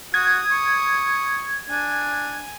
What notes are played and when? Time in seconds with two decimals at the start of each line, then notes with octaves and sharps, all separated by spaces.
0.14 F#4 D#6 G#6
0.52 C#6
1.71 D4 G#5